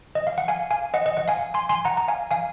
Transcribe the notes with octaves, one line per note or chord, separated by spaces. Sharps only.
D#5
F5
F#5
F5 G#5
F5 G#5
D#5 F#5
D#5 F#5
D#5 F#5
F5 G#5
G#5 C6
G#5 C6
F#5 A#5
A#5
F5 G#5
F5 G#5